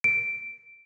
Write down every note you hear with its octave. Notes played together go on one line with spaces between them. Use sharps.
D7